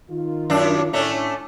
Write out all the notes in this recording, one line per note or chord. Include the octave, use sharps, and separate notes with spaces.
D#3 F4
F#2 D4
A2 A3 C#4 D4